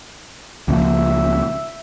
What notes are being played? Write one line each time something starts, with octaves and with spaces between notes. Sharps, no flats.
C#2 A#2 F3 E5